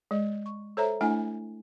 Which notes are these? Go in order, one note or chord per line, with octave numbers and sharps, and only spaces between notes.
G#3 D#5
C#6
A4 C5 C#5 E5 A#5
A3 D4 E4 F#5 G#5